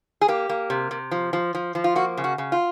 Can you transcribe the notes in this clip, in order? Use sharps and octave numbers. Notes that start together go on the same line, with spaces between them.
G#4
A#3 G4
A#3
C3
C3
F3
F3
F3
F3
F4
A#3 F#4
C#3
F#4
C#3
F4